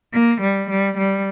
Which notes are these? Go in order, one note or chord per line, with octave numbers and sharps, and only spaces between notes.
A#3
G3
G3
G3